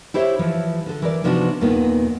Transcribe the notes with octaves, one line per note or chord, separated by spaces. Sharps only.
E4 G4 C5 C#5 E5
E3 F3
D3 A4
E3 A#4 D5
C3 F3 B3 D4 D#4 F#4
D#2 A#2 D#3 B3